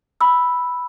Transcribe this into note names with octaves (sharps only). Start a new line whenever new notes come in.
B5 E6